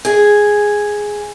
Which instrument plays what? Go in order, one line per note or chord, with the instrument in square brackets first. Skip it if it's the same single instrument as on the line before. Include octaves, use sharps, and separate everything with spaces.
[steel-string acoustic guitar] G#4 G#5